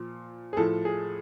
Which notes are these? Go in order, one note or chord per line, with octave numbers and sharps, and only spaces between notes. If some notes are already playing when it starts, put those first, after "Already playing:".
Already playing: A#2 F3
G#4
A2 F3 A4
G#4